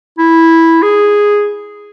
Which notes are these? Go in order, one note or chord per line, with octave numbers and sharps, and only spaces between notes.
E4
G#4